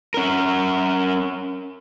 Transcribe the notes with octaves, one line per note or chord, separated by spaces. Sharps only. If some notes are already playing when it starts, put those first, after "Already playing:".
C#4 A#4